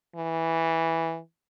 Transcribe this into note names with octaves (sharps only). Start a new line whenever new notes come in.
E3